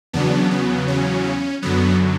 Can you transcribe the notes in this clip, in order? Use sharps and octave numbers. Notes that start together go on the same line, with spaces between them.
E2 C#3 F#3 B3 D4
B3
C#4
F#2 D3 F#3 B3